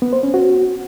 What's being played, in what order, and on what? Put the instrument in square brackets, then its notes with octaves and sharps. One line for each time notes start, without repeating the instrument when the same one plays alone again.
[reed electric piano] B3
C5
C#4
F#4